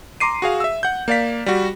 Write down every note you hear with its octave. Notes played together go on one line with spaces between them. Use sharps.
A#5 C6 D6 C7 D#7
F#4 G#4 F5
E5 E6
F#5 G6
A#3 D5 F5 B6
G3 F#4